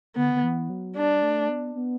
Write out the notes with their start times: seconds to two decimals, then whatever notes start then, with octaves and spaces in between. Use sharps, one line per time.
0.16 D3 B3
0.34 D3
0.43 E3
0.70 F#3
0.96 G3 D4
1.22 A3
1.49 B3
1.75 B3